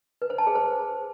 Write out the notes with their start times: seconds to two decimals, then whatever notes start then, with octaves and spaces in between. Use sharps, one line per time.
0.22 B4
0.30 C5
0.38 A5
0.47 G#4
0.55 C5